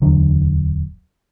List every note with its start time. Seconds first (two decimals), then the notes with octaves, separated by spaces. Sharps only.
0.02 D1 E2 D3 F#3